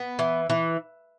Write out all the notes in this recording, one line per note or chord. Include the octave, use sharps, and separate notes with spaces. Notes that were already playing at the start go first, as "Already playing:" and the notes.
Already playing: B3
E3
E3